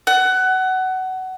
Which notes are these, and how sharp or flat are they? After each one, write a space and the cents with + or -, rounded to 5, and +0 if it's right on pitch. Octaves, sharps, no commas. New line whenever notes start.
F#5 +20